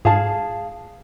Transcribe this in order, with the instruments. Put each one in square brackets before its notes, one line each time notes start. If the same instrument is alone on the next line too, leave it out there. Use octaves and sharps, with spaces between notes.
[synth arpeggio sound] G#2 [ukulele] G#4 F5 A5